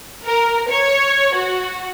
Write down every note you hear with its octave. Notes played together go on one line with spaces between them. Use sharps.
A#4
C#5
F#4